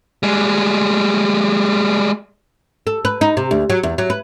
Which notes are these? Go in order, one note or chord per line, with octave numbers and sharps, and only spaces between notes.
G3 G#3
A4
B4
D#4
C3
D2
F#3
E2
F#3
B4